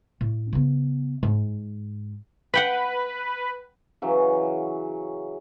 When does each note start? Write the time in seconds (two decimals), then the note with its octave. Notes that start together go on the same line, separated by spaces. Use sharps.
0.21 A2
0.53 C#3 B3
1.23 G#2
2.54 B4 F#5 G5 B5
4.02 C#3 E3 F#3